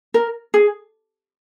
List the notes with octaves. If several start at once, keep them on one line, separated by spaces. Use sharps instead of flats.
A#4
G#4